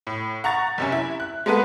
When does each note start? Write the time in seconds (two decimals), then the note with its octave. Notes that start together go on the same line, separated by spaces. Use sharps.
0.07 A2
0.44 F#5 A#5 C#6 A6
0.78 F#1 C3 C#4
0.92 E4
1.20 F#6
1.46 G#3 A#3 B3 A4 B4 F#5